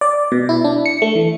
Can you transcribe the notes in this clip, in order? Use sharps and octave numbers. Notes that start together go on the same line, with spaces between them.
D5
B2
E4
D4
C#7
A3
E3